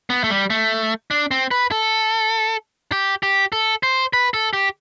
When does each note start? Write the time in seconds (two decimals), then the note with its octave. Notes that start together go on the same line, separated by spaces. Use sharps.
0.10 B3
0.24 A3
0.30 G3
0.50 A3
1.11 D4
1.31 C4
1.51 B4
1.72 A4
2.92 G4
3.23 G4
3.52 A4
3.83 C5
4.13 B4
4.34 A4
4.53 G4